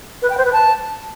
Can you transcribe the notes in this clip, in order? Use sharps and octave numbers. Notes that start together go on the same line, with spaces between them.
B4
G5
C5
B4
A5